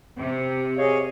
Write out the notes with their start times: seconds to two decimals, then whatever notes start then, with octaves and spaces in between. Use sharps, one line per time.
0.18 C3
0.78 G#4 C#5 D#5 F5